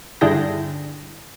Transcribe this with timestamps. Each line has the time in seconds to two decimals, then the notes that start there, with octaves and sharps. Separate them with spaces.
0.21 G2 D3 E4 G#4 G5 A#6